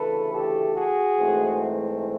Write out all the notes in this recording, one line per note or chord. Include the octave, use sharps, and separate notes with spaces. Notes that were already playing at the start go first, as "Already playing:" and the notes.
Already playing: D2 C#3 E3 A3 A4 B4
G4 A4
F#4 G#4
G#2 E3 A3 C4